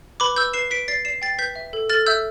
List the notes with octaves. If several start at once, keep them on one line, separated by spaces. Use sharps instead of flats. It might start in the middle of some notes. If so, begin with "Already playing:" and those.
B4 B5 D6
B4 E6 G6
B4 C7 E7
B4 B6 D7
D5 A6 C7
D5 C7 E7
G5 A6 C7
B4 G6 B6
E5
A4
A4 F6 A6
E5 E6 G6